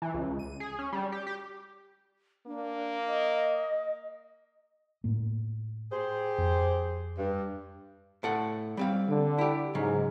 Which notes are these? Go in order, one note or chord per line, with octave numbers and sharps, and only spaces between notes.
E3
C#2
D#7
G#4
C#4
G3
G4
G4
A#3 D4
D#5
A2 A#3
G4 G#4 C5
F2
G2
A2 A4 F#5
G3 C4 F5
D3
E4 G4
G#2 C#3 F#3